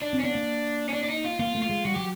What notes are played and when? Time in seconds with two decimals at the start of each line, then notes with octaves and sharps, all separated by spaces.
0.02 D4
0.13 C4
0.19 C#4
0.24 B3 D4
0.35 A#3
0.89 C#4
0.93 D4
1.03 D4
1.09 D#4
1.25 F4
1.39 A#3 F4
1.55 A3
1.62 F4
1.70 G#3
1.85 G3 F#4
1.95 F#3 G4